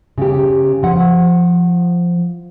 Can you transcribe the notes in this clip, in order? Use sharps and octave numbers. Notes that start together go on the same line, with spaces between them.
C#3 G4
F3 F#5